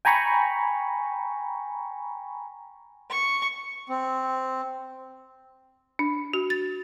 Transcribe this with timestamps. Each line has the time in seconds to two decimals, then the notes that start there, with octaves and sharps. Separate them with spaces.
0.05 G5 G#5 A#5 B5 C#6
3.10 C#6
3.89 C4
5.99 D4
6.33 F#4
6.50 A6